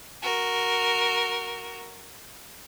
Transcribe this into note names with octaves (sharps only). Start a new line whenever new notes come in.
F#4 A#4